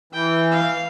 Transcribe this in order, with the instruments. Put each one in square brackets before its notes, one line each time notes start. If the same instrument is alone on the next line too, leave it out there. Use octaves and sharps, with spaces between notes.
[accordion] E3 [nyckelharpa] G5
[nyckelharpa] F5